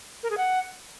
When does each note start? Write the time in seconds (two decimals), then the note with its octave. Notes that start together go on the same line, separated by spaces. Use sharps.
0.23 A#4
0.30 G#4
0.37 F#5